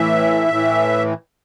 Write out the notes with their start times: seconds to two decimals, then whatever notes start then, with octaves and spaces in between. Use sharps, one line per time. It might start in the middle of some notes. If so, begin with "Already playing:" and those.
Already playing: A2 E3 E5
0.49 A2 E3